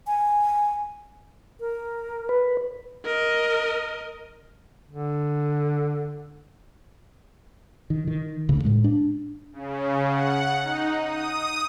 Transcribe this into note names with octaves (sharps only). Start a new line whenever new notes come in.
G#5
A#4
B4
A#4 D#5
D3
D#3
D#3
D2 C#3
A2 G#3
D4
C#3
F#5
D#4
D#6